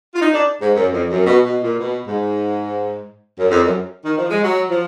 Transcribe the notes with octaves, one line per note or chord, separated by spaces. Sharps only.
F4
D#4
D4
G#2
F#2
F2
F#2
B2
B2
A#2
B2
G#2
F#2
F2
F#2
D#3
F3
G#3
F#3
F3